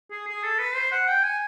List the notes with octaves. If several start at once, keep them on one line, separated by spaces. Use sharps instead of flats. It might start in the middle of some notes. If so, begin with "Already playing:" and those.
G#4
G#4
A4
B4
C5
F#5
G5
G#5